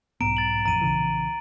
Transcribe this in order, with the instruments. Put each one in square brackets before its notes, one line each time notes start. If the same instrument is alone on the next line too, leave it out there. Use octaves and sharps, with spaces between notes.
[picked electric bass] B1 G#2 B3 [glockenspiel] A#5 D7
[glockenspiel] A6 F#7
[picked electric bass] A1 F2 [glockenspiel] A#5 D#7
[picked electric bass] A#1 C#3 E3